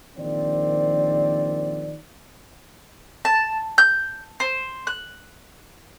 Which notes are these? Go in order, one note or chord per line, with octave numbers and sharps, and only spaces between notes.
A#1 D#3 F3 C4 D5
A5
G6
C5
F#6